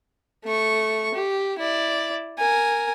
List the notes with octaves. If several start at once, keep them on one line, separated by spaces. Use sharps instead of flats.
A3 C#6
G4
E4 D5
A#4 G#5